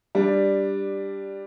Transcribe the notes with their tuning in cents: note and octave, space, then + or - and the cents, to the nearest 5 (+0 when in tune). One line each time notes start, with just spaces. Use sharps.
G3 +5 D4 +0